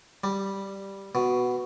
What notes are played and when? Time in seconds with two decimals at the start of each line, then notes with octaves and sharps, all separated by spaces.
0.24 G3
1.15 B2